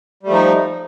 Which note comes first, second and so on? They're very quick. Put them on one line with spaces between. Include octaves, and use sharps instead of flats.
G3 A3 F3 D#4